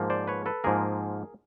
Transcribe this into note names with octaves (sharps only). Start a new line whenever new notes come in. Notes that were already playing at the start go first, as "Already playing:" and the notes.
Already playing: G#2 F3 A#3
C5 D5
B4 C#5
A4 B4
G#2 F3 A#3 G#4 A#4